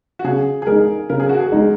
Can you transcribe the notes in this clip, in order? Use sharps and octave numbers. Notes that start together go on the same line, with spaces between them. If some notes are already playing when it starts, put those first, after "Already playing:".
F#4
C#3 G#4
G#4
G#3 D#4 A#4
C#3 A#4
G#4
F#4
G#4
G#3 D#4